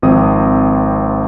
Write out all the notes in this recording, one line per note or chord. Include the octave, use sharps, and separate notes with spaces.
G#1 F3 C4 D#6